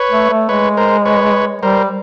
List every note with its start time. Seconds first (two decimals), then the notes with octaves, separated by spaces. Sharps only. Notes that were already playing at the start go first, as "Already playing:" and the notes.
Already playing: B4 C#5
0.11 A3
0.30 A3
0.49 G#3 B4 C#5
0.77 A#4 C5
1.05 B4 C#5
1.62 G3 A#4 C5